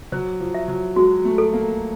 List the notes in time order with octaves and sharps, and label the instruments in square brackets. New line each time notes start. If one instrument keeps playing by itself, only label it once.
[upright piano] F#3 [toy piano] C5
[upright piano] F3
[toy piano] E5
[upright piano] F#3
[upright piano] G#3 [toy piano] F#4
[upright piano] A3
[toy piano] A4
[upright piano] A#3